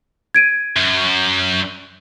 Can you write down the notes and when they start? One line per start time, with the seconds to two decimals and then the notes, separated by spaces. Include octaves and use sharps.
0.34 G#6 D7 D#7
0.76 F#2